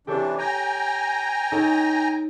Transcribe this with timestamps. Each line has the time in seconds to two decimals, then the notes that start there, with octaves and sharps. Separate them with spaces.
0.07 C3 E3 D4 G4 A4 C#5
0.38 G5 G#5 A#5
1.52 D#4 A4 C#5